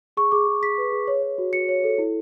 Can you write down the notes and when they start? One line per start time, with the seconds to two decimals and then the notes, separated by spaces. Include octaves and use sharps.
0.17 G#4 C#6
0.32 G#4 D6
0.47 G#4
0.62 G#4 B6
0.78 B4
0.92 G#4
1.07 C#5
1.22 C#5
1.38 F#4
1.53 F#4 C#7
1.69 C#5
1.84 A4
1.98 E4